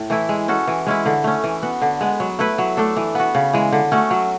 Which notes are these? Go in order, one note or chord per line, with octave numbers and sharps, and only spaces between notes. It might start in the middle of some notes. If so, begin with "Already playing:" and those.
Already playing: A2
E3 A3 E4
G#3
C#4 F#4 A4
E3
G#3 C#4 E4
D3
A3 C#4
E3
B3 F#4
D3
G#3 B3
F#3
A3 E4 B4
F#3
A3 D4 A4
E3
B3 F#4
C#3
E3 G#3
D3
A3 C#4 F#4
F#3